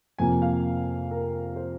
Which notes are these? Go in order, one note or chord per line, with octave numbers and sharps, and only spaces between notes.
F2 C3 F3 A#3 G#5
F5
A#4
C5